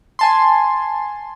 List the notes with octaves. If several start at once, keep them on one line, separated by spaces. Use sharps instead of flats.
G#5 A5 C6